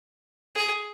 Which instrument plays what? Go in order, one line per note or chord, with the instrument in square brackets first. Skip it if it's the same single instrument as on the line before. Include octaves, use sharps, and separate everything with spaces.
[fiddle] G#4